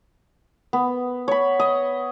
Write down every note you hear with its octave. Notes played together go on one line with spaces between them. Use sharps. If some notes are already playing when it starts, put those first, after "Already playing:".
B3
C#5 B5
D#5